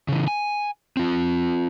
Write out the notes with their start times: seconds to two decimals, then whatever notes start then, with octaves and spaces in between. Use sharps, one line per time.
0.08 C#3 E3
0.28 G#5
0.97 C4 F4